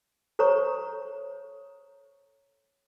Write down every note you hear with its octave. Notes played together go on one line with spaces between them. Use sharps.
A4 C5 C#5 A#5 C#6